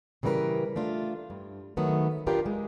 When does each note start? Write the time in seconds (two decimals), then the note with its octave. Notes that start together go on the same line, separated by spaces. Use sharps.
0.23 C#3 E3 G3 F4 A#4 B4
0.76 A3 D4 F4
1.30 G2
1.77 D#3 F#3 A3 B3
2.27 D4 F4 G4 A#4 B4
2.46 G#3